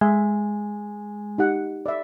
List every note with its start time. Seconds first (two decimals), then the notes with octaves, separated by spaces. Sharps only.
0.01 G#3 E5
1.38 D#4 G4 F#5
1.86 D5 E5